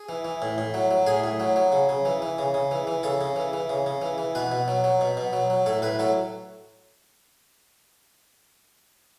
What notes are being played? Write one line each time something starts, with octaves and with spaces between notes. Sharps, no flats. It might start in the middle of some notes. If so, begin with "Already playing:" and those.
Already playing: G#4
E3
E3
A2
A2
F#3
F#3
A2 G#4
A2
F#3
F#3
C#3
C#3
E3
E3
C#3
C#3
E3
E3
C#3 A4
C#3
E3
E3
C#3
C#3
E3
E3
B2 B4
B2
F#3
F#3
B2
B2
F#3
F#3
A2 A4
A2 B4
F#3 A4